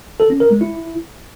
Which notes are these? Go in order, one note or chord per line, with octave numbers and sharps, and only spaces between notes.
A4
C#4
A#4
G#3
E4